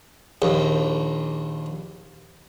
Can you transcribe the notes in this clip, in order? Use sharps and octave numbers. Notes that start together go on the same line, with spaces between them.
A#1 D#2